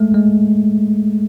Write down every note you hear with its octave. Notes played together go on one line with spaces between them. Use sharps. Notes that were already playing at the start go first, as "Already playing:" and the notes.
Already playing: G#3 A3
G#3